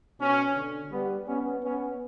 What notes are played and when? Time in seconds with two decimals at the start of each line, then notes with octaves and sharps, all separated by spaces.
0.20 B2 C#4
0.56 D3
0.92 G3 B3
1.27 B3 C#4
1.63 B3 C#4